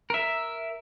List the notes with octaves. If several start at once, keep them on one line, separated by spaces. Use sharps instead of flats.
A#4 E5